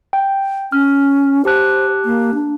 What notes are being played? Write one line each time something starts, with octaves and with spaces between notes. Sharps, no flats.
G5
C#4 F6
G4 C5 A5 F#6
A#3
D4